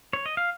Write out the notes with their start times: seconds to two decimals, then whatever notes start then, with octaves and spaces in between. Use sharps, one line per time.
0.13 C#5
0.26 D#5
0.37 F5